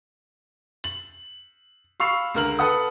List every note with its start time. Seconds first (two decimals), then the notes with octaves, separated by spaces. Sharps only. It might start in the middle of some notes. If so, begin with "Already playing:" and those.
0.84 F#7
2.00 F5 B5 C#6 E6 C7 F7
2.35 C#2 D3 A#4 F6 F#7
2.59 A4 B4 F#5 D#6